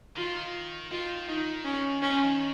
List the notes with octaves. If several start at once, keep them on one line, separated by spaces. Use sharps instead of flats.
D#3 F4
D#3 F4
D#3 D#4
C#4
D#3 C#4
F3
D#3